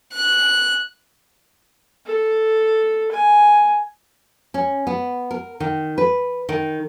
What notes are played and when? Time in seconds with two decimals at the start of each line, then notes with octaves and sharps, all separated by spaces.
0.13 F#6
2.06 A4
3.12 G#5
4.54 C#4
4.87 B3
5.31 A#4
5.60 D#3
5.98 B4
6.49 D#3